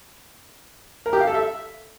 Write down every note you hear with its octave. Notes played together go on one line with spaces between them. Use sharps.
A#4
G4
F5
A4
E5